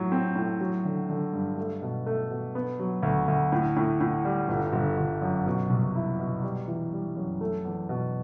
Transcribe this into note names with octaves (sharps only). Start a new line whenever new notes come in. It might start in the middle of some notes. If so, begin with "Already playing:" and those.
Already playing: A2 F#3
C4
A2
F#3
D3
D3
G2
A3
B2
A3
B2
B3
F#3
D2
D2
A2
A2
A2
G3
G1
G1
G1
F#2
B2
C2
E4
B2
G3
E3
G3
F#2
A3
E2
B2